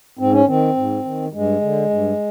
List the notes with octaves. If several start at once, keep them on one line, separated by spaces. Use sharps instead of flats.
G#2 C4
C#4
D#3 C4
G#2
D#3
G2 G#3
D3
G2